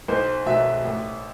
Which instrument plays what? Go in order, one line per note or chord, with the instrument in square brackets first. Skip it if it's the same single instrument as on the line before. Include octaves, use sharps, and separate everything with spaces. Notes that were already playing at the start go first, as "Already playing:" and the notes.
[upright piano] B1 C5
B2 F#3 E5
A1